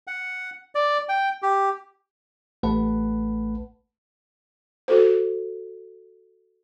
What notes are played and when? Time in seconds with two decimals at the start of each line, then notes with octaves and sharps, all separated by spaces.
0.07 F#5
0.75 D5
1.09 G5
1.42 G4
2.63 A1 A3 B4 F#5 A5 B5
4.88 F#4 A4 C5